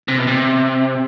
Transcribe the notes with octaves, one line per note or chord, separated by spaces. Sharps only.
C3
B2
C3